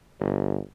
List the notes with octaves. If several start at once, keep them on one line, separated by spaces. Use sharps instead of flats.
G1